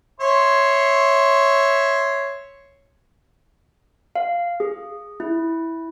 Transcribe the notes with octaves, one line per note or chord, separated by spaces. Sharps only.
C#5 E5 C6
F5
G#4
E4